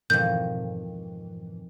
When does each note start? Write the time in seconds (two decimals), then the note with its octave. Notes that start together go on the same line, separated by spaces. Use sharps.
0.10 F2 G#2 B2 D#3 E3 G6